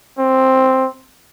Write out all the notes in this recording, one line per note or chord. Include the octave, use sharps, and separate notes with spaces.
C4